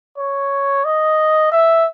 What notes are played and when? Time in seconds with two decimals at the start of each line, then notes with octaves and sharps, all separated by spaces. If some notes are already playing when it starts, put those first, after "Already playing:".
0.18 C#5
0.85 D#5
1.52 E5